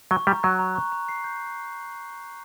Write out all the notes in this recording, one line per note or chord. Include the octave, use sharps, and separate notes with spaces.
F#3 C#6
G3 A#5
F#3 F#6
A#5
C#6
A#5
C7
G6